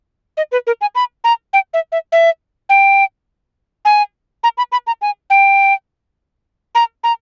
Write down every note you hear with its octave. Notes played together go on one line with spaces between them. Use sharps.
D#5
B4
A#4
G#5
B5
A#5
G5
E5
E5
E5
G5
G#5
A#5
B5
B5
A#5
G#5
G5
A#5
A#5